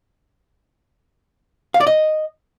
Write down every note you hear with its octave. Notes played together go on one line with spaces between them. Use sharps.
F5
D5
D#5